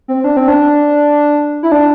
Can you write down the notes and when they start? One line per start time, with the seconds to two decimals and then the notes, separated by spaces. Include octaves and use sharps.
0.08 C4
0.24 D4
0.37 C4
0.48 D4
1.63 E4
1.72 D4